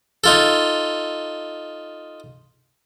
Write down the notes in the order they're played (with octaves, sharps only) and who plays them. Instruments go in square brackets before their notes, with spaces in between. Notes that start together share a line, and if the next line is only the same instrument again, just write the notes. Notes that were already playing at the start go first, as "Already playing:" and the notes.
[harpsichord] D#4 F4 A4